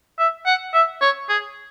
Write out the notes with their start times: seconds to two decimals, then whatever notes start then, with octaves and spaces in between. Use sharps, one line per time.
0.19 E5
0.46 F#5
0.74 E5
1.02 C#5
1.29 G#4